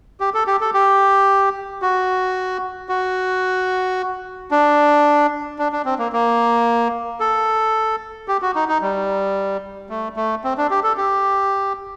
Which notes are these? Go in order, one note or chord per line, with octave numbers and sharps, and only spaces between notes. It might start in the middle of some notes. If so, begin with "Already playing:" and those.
G4
A4
G4
A4
G4
F#4
F#4
D4
D4
D4
C4
A#3
A#3
A4
G4
F#4
D#4
D#4
G3
A3
A3
C4
D4
G4
A4
G4